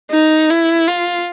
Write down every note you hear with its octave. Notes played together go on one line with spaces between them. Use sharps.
D#4
E4
F4